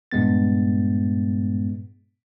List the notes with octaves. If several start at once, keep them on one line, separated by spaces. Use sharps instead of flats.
G2 A#2 G#3 B3 A6